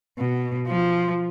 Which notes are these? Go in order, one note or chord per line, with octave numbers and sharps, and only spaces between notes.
B2
F3